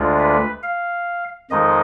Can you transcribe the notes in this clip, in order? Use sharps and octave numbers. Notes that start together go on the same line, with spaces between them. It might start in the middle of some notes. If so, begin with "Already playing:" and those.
Already playing: D2 D3 G#3 D4 F4
B4
F5
F2 D#3 G#3 D#4 D#5